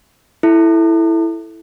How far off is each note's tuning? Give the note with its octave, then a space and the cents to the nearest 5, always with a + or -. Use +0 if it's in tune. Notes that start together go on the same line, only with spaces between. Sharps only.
E4 +0 A4 -5